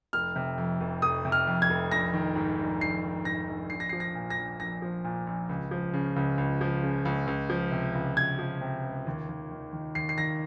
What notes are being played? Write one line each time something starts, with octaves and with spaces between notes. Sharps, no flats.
F1 F6
C3
F2
F1
F1 D#6
C3
F6
F2
G#6
F1
A#1 A#6
D#3
G#2
A#1
A#1 C7
D#3
G#2 A#6
A#1
A#1 C7
A#6
F3 C7
A#6
A#2
A#6
A#1
A#1 A#6
F3
A#2
A#1
C#2
F3
C#3
C#2
C#2
F3
C#3
C#2
C#2
F3
C3
C#2
C#2 G#6
F3
C3
C#2
D#2
D#2
D#3
D#3
D#2 C7
C7
D#2 A#6